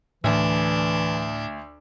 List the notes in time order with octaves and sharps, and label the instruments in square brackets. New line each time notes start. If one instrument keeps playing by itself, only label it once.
[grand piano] D2 [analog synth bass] A2 [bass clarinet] E3 [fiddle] D4